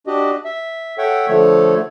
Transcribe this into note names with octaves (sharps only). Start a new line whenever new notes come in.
D4 F#4 G4 D#5
E5
A4 C#5 E5 F#5 G5
D3 F3 A3 A4 C#5